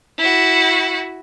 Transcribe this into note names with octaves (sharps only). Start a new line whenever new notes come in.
E4 F#4